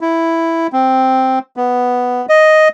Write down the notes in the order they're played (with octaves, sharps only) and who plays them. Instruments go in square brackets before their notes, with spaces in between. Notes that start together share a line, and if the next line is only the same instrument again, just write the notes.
[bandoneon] E4
C4
B3
D#5